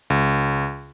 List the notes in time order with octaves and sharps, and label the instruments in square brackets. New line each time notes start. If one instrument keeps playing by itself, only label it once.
[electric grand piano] C#2